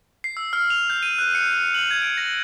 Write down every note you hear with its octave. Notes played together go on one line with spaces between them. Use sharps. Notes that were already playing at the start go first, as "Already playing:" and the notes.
C7
E6
F6
F7
G6
D#7
F#6
C#7
F#7
G#6
D7
A#6